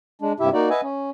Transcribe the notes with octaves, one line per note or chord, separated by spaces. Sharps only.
G#3 D4
G2 C3 E4 G4 E5
A#3 D#4 F#4 D5
B4 D#5 E5 F#5 G#5
C#4